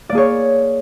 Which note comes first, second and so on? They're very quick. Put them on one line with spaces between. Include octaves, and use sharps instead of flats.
D5 A#3 G#4 C#5